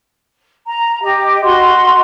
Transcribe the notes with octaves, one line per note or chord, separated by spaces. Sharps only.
A#5
G4 D#5
F#4 D#5 C6